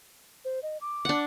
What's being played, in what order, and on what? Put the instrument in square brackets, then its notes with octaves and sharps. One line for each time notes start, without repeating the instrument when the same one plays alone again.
[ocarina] C5
D#5
D6
[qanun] D4 F#5